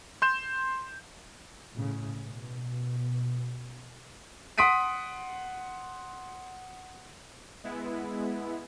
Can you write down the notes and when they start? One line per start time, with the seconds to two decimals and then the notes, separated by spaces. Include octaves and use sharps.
0.22 C6 G6 E7
1.75 A2 C#3
2.24 B2
4.58 F#5 C6 D#6 B6 D7 D#7
7.64 G#3 B3 E4